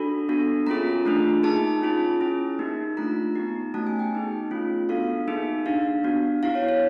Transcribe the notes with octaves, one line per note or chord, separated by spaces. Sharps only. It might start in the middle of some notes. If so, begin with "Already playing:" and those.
Already playing: D4 F#4 A4 B5
B3 D4 F#4 A4
A#3 C#4 F4 G#4 A#5
A3 D4 F4 G#4
A#3 D#4 G#4 A5
C#4 F4 G#4
C#4 E4 G#4
A#3 D#4 G4
A3 D4 F4 A#5
B3 D#4 G4
A3 C#4 F#4 A5
G#5
G5
B3 D#4 G#4
A3 C#4 F4
B3 D4 F#4 A4 F5
A#3 D#4 G#4
D4 G4 F5
B3 D4 F#4
B3 E4 G4 F5
C#5
C#5